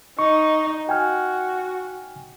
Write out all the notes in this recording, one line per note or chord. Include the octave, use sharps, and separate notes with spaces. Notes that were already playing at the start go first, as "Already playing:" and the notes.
D#4 C#6
F#4 G5 G#5 F6